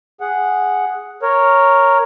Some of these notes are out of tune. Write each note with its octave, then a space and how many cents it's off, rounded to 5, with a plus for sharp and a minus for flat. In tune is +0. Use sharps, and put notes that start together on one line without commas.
G#4 +0 F#5 +0
A#4 +0 C#5 +0